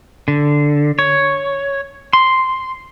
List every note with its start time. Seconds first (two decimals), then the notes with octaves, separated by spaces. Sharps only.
0.28 D3
0.99 C#5
2.13 C6